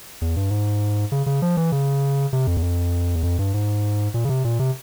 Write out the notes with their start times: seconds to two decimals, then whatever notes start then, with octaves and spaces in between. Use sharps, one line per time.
0.21 E2
0.36 G2
0.51 G#2
1.12 C#3
1.26 C#3
1.42 F3
1.57 E3
1.72 C#3
2.33 C3
2.47 F2
2.57 E2
2.63 F2
3.16 E2
3.23 F2
3.39 G2
3.54 G#2
4.14 A#2
4.24 C#3
4.29 C3
4.44 A#2
4.59 C3